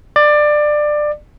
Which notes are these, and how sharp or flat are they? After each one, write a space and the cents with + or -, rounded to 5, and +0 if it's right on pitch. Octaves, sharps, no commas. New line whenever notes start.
D5 +20